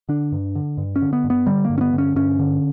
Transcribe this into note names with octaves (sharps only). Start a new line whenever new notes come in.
D3 D4
G2
D3
G2
C#4
D3
B3
G2
B3
D3 G3
A#3
G2
C#4
B3
D3
C#4
G2 C#4
D3